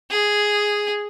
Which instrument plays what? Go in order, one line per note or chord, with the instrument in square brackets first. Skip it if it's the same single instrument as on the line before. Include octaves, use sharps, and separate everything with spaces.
[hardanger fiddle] G#4